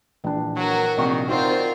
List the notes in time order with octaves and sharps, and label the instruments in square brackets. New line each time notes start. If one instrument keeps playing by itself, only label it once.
[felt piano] A#1 D4 [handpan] E3
[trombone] F#3 [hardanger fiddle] F#4 A#4
[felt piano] A#1 C3 C#6 [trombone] D#3
[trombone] C4 [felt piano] D#4 [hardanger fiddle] F4 A#4 [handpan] F#4 C5 D5